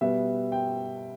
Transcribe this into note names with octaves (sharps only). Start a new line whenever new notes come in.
B2 G3 B3 E5
G5